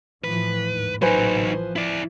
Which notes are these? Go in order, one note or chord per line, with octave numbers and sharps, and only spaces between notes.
A2 E3 F3 B4
D#2 G#2
A1 A#2 C#3 F#3 D#4 B4 C5 G#5
E3 F3
E4 D5